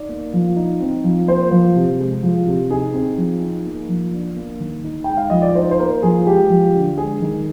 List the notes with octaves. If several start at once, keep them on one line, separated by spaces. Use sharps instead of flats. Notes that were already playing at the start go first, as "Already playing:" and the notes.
Already playing: D#4 D5
A#3
F3
D#4
C4
F3
A#3 C5
F3
C3
G#3
F3
C3
D#4 G#4
C4
F3
D#4
A#3
F3
D4
A#3
D#3
D#4
G#3 G5
F5
F3 D#5
D5
D#4 C5
C5
A#3 A#4
F3 G#4
G#3 G4
F3
D3
G#3 G#4
D#3